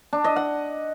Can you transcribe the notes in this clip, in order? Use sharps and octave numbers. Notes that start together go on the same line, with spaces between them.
D4
D#5
F#5